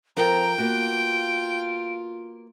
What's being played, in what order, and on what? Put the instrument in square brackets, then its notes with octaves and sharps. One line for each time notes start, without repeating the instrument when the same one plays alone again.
[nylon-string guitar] F3 A4 A#4 [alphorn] C4 [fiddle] G5 [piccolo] A#5
[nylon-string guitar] A#3 B3 F#4 [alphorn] F4 [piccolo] D7